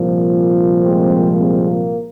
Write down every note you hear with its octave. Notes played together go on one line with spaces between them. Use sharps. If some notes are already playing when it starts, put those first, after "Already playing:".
Already playing: C2 A#2 F3
G#3 C4
G#3 C4
A#3